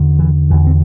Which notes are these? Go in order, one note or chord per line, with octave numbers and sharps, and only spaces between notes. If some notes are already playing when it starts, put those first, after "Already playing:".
Already playing: E2 D3
E3
E2 D3 E3
C4